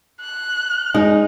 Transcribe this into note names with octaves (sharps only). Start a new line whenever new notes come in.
F#6
G#3 D#4